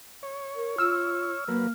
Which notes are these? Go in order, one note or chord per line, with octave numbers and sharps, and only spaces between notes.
C#5
A#4
F4 E6 F6
F#3 A#3 A#4 B4